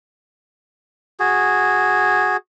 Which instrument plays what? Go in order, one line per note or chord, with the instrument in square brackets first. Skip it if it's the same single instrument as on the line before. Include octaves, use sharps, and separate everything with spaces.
[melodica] F#4 G#4